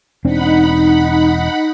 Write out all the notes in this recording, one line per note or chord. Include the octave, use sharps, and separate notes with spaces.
E1 C4 D4 D#4 F#5 B5